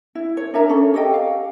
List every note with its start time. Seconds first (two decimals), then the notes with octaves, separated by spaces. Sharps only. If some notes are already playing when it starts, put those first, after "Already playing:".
0.15 E4
0.37 C#5
0.54 D4 A#4 E5 A#5
0.69 C#4 A4
0.94 G4 A4 D#5 G5
1.14 F5